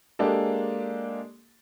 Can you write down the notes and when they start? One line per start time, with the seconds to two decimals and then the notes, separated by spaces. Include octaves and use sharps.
0.19 G#3 A#3 D4 G4 A4